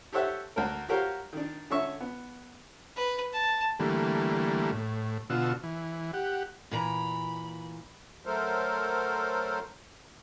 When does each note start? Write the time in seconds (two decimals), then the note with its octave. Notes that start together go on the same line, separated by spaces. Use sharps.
0.13 G4 A4 C5 C#5 E5 F#5
0.56 D2 F#4 A#4
0.89 F#4 G4 A#4 C5 C#5 F5
1.33 D#3 D4
1.70 D3 C#4 E5 C#6
2.01 B3
2.97 B4
3.33 A5
3.80 D3 E3 G3 A3 A#3
4.72 A2
5.30 B2 D3 F4 F#4 E6
5.63 E3
6.13 G4 F#5
6.71 A#2 E3 A#5 B5
8.26 F#3 A3 A4 A#4 C5